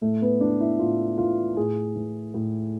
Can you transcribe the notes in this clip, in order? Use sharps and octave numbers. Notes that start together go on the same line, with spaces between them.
A2 A3
B3
E3 D4
E4
A2 F4
E3 F4
A2 G#4
E3
A2